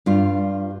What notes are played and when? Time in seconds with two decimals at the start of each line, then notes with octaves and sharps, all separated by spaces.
0.06 G2 F4